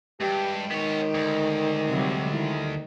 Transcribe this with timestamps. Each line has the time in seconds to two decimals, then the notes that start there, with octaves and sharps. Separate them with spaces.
0.20 G2 G#3 G4 G5
0.71 D#3 B3 C#5
1.14 D2
1.88 C3 F#3 G3
2.33 D#3 E4